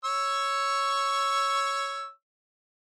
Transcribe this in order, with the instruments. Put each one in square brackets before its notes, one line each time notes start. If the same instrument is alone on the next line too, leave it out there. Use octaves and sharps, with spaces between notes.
[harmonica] C#5 C#6 E6